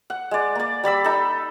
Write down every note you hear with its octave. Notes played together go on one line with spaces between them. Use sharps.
F#5
G#3 D5
A#3 D5
G3 D5 B5 E6
D#4 A4